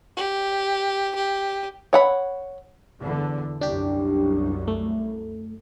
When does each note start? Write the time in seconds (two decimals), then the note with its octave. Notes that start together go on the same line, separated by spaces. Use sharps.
0.17 G4
1.15 G4
1.93 C#5 F#5 B5
3.00 E2 D3
3.61 C2 F#2 D4 G4
4.67 A3